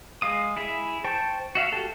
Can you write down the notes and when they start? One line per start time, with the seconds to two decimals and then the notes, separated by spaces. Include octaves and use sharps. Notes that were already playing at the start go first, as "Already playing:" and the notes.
0.22 G#3 F5 D#6
0.56 E4 G#4 E5
1.04 C5 G5 A5 C#6
1.55 F#4 E5 F5
1.72 F#4 G4 A4